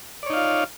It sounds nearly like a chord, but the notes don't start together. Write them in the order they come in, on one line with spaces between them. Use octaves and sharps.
D5 C#5 D#4 F5 F4